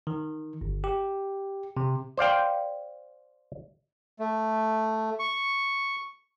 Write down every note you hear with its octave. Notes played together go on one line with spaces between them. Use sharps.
D#3
G1
G4
C3
C5 D5 F5 G5
A3
C#6